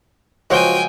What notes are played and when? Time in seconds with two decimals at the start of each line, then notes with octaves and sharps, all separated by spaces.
0.50 C#2 F3 F#3 F#4 C5 G5 G#5 G7